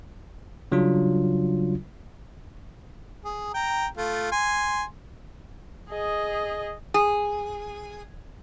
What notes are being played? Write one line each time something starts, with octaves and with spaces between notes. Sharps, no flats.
C#3 F#3 G3 D4 F4
G#4
G5 A#5
A3 F4
G#5 C6
G#4 D#5
G#4